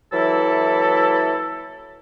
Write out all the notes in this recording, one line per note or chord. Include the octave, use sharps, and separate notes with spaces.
E3 F#3 A#3 E4 A4